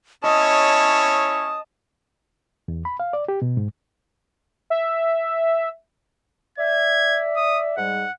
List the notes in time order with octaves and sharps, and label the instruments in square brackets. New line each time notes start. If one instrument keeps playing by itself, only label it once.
[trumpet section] C#4 E4 C#5 [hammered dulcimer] D#5 [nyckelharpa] A5 [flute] D#6
[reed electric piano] E2
B5
F5
D5
G4
B2
G#2
[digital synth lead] E5
[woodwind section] D5 E5 [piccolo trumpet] G#6
[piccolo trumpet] D#6
[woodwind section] G#2 G3 [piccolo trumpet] F#5